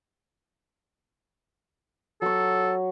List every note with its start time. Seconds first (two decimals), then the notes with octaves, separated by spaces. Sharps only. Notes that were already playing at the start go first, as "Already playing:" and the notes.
2.22 F#3 A4 C#5